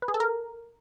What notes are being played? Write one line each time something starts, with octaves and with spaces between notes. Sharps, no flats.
B4
G#4
A4
A#4